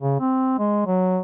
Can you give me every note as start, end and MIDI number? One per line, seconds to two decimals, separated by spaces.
0.01 0.16 49
0.20 0.53 60
0.58 0.84 56
0.86 1.20 54